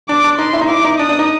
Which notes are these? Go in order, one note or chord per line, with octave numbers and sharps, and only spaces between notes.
D4 D6
D4
D#4 C6
E4
D#4
E4 D6
D#4
D4 D#6
D4
D#4